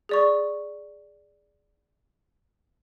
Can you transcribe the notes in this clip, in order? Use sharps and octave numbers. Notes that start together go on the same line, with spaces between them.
G#4 D5 C#6